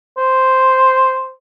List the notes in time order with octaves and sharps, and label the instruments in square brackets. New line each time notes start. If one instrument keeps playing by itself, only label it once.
[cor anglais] C5